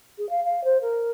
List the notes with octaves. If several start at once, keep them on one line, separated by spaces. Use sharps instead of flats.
G#4
F5
F5
C5
A#4